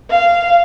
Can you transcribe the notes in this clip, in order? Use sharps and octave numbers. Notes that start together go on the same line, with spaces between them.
F5